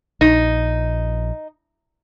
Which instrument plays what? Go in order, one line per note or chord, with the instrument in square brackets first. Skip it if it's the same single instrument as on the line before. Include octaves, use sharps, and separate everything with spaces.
[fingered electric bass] A#1 [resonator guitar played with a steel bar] D#4